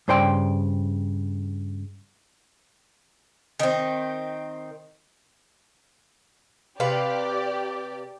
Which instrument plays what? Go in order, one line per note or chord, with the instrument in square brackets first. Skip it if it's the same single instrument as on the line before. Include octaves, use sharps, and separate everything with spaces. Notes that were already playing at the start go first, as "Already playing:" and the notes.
[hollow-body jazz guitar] G2 C#3 C5 D5 G5 C6
[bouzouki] D#3 C4
[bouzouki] C3 B4 F5 [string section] G4 D5